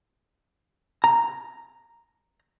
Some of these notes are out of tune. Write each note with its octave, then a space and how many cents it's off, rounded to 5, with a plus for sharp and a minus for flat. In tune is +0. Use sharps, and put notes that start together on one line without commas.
A#5 +0